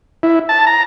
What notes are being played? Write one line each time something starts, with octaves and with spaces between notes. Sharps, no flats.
E4
A5
A#5